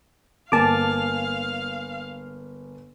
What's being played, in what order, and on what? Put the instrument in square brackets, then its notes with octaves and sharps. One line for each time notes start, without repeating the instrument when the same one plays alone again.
[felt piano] G1 A#3 G#5 [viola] F5 [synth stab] A5 D6